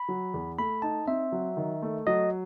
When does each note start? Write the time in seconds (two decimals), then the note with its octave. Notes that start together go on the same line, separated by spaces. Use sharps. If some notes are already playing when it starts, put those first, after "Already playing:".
Already playing: B5
0.08 F#3
0.34 E2
0.58 A3 B5
0.82 D#4 A5
1.07 C4 E5
1.32 F#3
1.57 D#3
1.82 A3
2.07 F#3 D#5